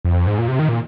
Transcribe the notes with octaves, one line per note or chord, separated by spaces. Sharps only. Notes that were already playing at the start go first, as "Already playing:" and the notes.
F2
G#2
A#2
C3
D#3
A#2